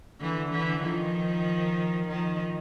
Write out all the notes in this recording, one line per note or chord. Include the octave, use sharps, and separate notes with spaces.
D3 E3
D3 E3
D#3 F3
D#3 F3